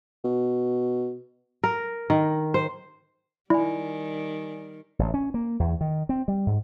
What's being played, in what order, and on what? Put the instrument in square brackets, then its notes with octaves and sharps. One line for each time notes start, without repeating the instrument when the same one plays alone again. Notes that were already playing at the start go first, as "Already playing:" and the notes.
[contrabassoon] B2
[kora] A#4
D#3
C5
[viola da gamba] D#3 G3 [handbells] E4 [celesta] D5 G#5
[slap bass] A1
C#4
A#3
E2
D#3
C4
G3
G#2